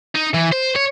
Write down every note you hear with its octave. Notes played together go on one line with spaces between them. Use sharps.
D#4
E3
C5
C#5